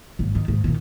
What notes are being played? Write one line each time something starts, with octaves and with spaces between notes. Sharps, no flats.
G#1
D#3
G#2
A#2 D#3